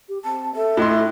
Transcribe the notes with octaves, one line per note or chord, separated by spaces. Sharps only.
G4
C4 A5
A4 E5
A2 D#5 C6 F#6